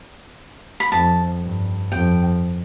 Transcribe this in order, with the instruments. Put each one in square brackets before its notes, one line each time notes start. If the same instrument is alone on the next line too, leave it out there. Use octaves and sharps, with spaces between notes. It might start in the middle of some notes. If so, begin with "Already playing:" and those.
[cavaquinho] B5
[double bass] F2 [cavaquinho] A5
[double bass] G2
[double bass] F2 [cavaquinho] G5